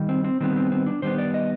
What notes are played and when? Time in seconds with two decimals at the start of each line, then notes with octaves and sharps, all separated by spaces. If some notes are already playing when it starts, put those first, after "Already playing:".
Already playing: D#3 G3
0.09 C4
0.24 C4
0.40 D#3 G3 B3 C4
0.56 C4
0.72 C4
0.87 D4
1.02 D#3 G3 B3 C5
1.18 D5
1.34 D#5